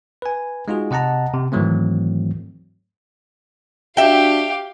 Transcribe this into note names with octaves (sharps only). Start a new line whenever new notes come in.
B4 G#5
G#3 D#4 F4 F#4 G#4
C3 D#5 F#5 A5 A#5
C3
G#2 D#3 E3 F#3 A3 C4
D4 F#4 G4 E5 F5 G5